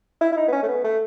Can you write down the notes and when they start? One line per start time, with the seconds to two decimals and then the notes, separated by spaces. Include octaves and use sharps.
0.21 E4
0.32 E4
0.36 D#4
0.48 B3
0.52 C#4
0.63 A3
0.68 B3
0.84 A3